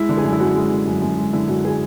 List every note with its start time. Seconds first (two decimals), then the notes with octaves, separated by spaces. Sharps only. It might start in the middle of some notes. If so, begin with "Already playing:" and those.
Already playing: G#3 E4
0.09 D3
0.17 G#4
0.24 F#2
0.33 E4
0.40 F#2 F#4
0.56 G#3
0.72 D3
0.86 F#2
1.02 F#2
1.18 G#3
1.33 D3 E4
1.48 F#2 F#4
1.65 G#4